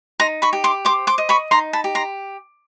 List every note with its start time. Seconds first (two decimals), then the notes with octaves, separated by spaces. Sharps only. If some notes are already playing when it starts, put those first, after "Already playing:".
0.20 D#4 A#5 C6
0.42 B5 C#6
0.53 G4
0.64 C6 D6
0.85 C5 C6 D6
1.07 C6 D6
1.18 D#5
1.29 B5 C#6
1.51 D#4 A#5 C6
1.73 A5 B5
1.84 G4
1.95 A#5 C6